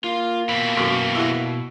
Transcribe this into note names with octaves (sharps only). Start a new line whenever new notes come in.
A#3 F4
B2 E3 C4 B5
F#2 F#3
E4 F#4